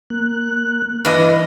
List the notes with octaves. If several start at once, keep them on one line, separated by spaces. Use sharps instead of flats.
A#3 F#6
G2 E3 B4 D#5